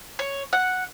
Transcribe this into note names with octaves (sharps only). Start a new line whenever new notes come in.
C#5
F#5